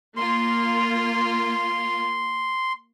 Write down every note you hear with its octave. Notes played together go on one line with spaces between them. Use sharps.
A#3 F4 C6